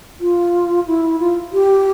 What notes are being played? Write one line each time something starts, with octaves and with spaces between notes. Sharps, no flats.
F4
E4
F4
G4